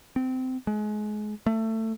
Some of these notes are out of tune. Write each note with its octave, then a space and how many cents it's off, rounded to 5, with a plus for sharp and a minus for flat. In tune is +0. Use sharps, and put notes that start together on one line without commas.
C4 -20
G#3 +30
A3 +20